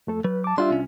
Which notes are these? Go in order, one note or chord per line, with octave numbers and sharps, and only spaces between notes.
F2 A3 A4
F#3 B4
A5 D6
G3 D4 F4 E5 C6
C2 C#4